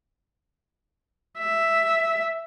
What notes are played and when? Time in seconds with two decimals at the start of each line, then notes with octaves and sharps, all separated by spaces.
1.38 E5